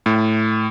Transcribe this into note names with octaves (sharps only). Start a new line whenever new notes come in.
A2